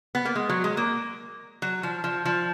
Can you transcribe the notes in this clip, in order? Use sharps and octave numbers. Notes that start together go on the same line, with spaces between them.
B3
A#3
G#3
F#3
G#3
A#3
F#3
F3
F3
F3